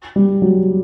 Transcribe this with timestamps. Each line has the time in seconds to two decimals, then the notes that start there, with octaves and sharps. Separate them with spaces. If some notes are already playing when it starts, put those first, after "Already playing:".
0.16 G3
0.42 F#3